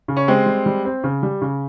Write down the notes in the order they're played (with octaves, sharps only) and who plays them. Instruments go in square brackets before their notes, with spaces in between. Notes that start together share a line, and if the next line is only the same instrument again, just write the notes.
[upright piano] C#3
[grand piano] C#4
[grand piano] G#3 C4 [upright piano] G4
[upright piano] G3
G3
C4
C#3
G3
C#3